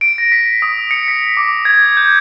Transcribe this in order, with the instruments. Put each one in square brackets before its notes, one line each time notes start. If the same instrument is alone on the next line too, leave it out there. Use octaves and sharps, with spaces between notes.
[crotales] D7
A#6
B6
D#6
C#7
B6
D6
G#6
G6